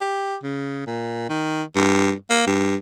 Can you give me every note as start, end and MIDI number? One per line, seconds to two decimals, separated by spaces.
0.01 0.36 67
0.43 0.85 49
0.87 1.25 46
1.29 1.63 51
1.76 2.12 43
2.30 2.43 58
2.47 2.76 43